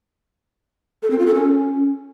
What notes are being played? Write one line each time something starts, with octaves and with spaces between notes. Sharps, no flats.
A4
C4
F4
A4
C#4